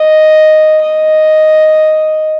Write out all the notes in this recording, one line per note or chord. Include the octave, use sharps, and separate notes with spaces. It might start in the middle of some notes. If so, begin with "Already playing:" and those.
Already playing: D#5
D#5